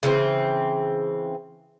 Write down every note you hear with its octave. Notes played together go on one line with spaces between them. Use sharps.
C#3 E3 B3 C4